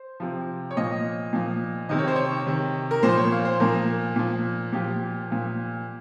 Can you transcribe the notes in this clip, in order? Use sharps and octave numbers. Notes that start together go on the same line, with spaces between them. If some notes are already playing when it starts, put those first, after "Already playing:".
Already playing: C5
C3 F3
C#5
A#2 F3 D#5
A#2 F3
C3 D#3 D#5
C#5
C5
C#5
C3 D#3
A#4
A#2 F3 C5
C#5
F5
C5
A#2 F3 A#4
A#2 F3
A#2 F3 G4
A#2 F3